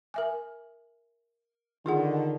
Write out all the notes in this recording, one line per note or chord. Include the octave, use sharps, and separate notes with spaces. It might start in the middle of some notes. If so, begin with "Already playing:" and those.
A#4 E5 G#5
D3 D#3 F4 G#4 F#5